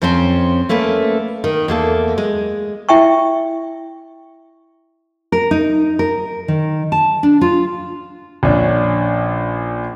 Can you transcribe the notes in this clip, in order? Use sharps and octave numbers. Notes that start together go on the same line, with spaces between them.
F2 F3 C4 C#4 C5
A3 A#3 C#4 B4
D#3
E2 A#3 A4
G#3
E4 E5 G5 C#6
A#4
D#4
A#4
D#3
A5
D4
F4
A#1 C#4 D4